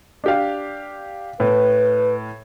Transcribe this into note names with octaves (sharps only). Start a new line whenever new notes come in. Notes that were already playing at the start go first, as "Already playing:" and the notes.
D4 G4 F5
A2 B4